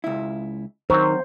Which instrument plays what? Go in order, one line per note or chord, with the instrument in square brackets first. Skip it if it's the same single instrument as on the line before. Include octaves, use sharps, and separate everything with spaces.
[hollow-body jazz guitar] C#2 E4
[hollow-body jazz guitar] D#3 [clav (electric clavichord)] F#3 C4 [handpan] C5